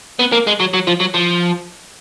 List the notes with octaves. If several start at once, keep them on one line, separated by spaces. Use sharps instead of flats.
B3
A#3
G#3
F#3
F#3
F3
F#3
F3